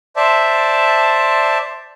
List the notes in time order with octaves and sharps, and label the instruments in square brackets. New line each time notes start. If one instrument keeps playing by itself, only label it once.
[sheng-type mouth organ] C5 D5 E5 A5